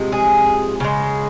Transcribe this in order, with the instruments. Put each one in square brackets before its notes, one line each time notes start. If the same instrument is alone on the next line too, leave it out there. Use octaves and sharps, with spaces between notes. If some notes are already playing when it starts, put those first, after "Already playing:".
Already playing: [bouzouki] C3 F3 G#3
G#4
C#3 G#3